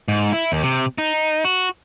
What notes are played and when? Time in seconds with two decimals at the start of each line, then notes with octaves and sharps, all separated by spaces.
0.08 G#2
0.33 E4
0.52 D#2
0.63 C3
0.98 D#4
1.44 F#4